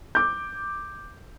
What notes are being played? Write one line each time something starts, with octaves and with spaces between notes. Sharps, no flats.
D6 G6